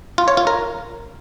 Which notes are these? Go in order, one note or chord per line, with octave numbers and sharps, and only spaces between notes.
F4
C#5
F4
A#4